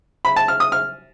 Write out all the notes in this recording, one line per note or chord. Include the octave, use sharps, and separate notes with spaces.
B5
A5
F6
D#6
F6